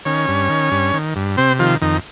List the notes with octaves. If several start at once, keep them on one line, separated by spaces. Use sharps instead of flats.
D#3 C#4 C#5
G2
D#3
G2
D#3
G2
C3 C4 C5
D#3 F3 F4
F2 D#3 D#4